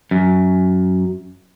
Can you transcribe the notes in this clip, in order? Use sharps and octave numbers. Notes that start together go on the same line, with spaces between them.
F#2